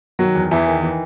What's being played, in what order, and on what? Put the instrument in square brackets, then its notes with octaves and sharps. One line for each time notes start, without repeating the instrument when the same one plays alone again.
[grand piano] D#3 F#3 F#4
E2
E2 E3 E4
D#3
E3